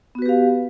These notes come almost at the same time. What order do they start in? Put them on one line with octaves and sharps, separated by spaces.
B3 F#4 B4 G4 F5